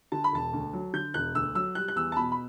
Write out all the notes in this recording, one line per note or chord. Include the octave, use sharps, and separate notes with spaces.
D3 A5
B5
E1 A5
D2
F#3
D3 G6
E1 F#6
D2 E6
F#3 E6
G3 F#6
F#6
E2 E6
A5
B2 B5
B5